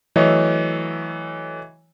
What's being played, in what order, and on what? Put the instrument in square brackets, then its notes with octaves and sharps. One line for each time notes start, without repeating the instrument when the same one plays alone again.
[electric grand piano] E3 F#3 A3 C#5 D#5 E5